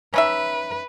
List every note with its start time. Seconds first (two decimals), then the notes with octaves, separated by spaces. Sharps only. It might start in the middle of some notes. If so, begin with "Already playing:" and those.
0.14 C#4 D#4 B4 E5